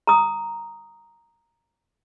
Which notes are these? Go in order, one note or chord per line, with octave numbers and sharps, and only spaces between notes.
A#5 D#6